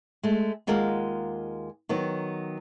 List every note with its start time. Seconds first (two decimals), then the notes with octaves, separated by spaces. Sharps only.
0.23 G#3 A3
0.67 D#2 G#3 F4 A#4 F5 F#5
1.89 D#3 F#3 B3